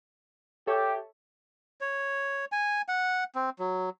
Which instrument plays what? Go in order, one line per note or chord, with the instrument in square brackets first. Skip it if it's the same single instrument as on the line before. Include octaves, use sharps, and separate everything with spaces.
[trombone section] G4 [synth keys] A4 C#5 E5
[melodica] C#5
G#5
F#5
C4
F#3